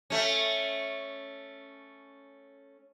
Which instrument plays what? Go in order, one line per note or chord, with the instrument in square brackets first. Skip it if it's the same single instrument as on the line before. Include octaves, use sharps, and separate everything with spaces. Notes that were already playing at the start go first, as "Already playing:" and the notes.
[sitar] A3 C#4